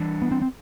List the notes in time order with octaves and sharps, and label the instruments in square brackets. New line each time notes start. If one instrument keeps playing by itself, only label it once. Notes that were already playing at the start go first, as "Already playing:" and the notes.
Already playing: [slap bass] E3 G3 D4
[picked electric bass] B3
C4
C4